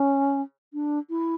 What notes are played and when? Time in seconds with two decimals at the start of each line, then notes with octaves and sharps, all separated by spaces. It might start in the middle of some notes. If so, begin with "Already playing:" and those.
Already playing: C#4
0.74 D4
1.10 E4